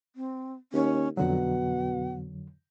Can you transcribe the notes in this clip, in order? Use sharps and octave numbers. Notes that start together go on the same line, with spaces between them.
C4
D#2 C#4
F2 B2 D3 F#3 F#5